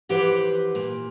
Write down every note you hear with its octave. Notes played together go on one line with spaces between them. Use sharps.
F2 E3 G4 B4 C5 F#5
A#2